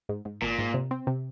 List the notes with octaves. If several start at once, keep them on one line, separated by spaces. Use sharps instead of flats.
G#2
G#2
G#1 A#2
G#2
C3
C4
C3